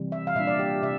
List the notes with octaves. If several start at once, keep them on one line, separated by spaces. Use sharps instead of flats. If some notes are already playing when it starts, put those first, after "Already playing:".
Already playing: C3 E3 G3
E5
F5
A#2 G3 D4 E5
D5
G4
C3 E5